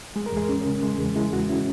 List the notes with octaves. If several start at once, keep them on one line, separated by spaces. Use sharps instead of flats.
G#3 G#4
A#4
E2 G#3 G#4
C#4
C#3
G#3
E2
G#3 E4
E2 F#4
C#4 E4